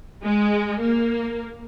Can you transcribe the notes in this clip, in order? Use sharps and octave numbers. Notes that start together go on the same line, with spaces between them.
G#3
A#3